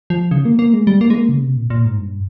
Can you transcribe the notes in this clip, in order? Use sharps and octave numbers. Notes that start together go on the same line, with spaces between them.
F3
C#3
A#3
A#3
G#3
G3
A#3
G#3
A#3
C#3
C3
A#2
A#2
G#2
G2